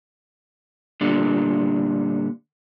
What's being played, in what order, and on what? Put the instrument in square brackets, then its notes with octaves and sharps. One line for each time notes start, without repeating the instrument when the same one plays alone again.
[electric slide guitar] A#2 D3 G3